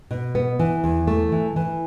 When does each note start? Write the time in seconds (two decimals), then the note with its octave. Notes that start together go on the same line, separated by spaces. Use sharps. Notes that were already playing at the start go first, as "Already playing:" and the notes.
0.11 B2
0.35 B3
0.59 E3
0.84 E2
1.07 A3
1.32 E3
1.56 E3